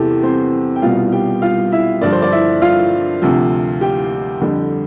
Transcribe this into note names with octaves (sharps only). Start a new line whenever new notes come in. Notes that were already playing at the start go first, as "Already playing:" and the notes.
Already playing: E2 C3 E3 G4 A4
C4 C5
G5
C2 B2 G3 F4 F5
G4 G5
F4 F5
E4 E5
G2 D3 F3 D4 D5
C5
D5
E4 E5
F4 F5
D2 C3 F3
G4 G5
F2 D3 G3